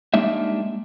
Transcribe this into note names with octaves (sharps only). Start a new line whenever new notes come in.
G3 G#3 A#3 D4 D#4 E5